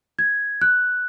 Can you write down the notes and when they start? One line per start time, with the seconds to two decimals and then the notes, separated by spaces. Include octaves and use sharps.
0.19 G#6
0.61 F#6